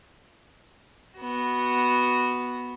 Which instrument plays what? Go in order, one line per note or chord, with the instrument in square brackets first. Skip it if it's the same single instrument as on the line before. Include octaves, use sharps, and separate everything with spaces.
[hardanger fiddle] B3 F#4